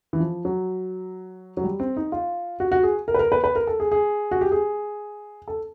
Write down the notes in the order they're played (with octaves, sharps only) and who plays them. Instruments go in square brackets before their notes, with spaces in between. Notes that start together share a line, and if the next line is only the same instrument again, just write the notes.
[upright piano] E3
F3
F#3
F#3
G3
C4
D#4
F4
F#4
F#4
G#4
A#4
B4
A#4
B4
B4
A#4
A4
G#4
G#4
F#4
G4
G#4
A4